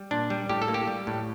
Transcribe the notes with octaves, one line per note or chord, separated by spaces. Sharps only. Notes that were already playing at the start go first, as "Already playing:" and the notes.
Already playing: G3
A#2 D4
G3
A2 G4
A4
A#3
G4
G3
A2